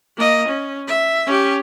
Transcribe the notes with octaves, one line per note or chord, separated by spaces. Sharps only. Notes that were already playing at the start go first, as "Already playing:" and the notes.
A#3 D#5
C#4
E5
C#4 G4